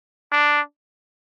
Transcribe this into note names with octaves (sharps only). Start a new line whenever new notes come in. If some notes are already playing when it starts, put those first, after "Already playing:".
D4